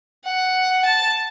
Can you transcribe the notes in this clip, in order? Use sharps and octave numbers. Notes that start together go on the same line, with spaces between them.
F#5
A5